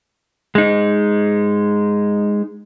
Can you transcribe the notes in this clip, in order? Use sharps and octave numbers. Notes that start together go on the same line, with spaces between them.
G#3 D#4